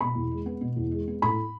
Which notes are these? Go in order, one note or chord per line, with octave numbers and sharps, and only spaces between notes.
B2 B5
E2
G#3
B3
B2
E2
G#3
B3
A2 B5